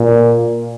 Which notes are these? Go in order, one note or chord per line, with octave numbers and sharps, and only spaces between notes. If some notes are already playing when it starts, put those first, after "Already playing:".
Already playing: A#2